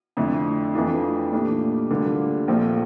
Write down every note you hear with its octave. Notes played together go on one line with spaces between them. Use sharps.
F2 D3 A3 E4
F2 E3 A3 D4 F4
A#2 A3 D4 G4
D2 D3 G3 A#3 F4
A#1 A#2 F3 A3 C4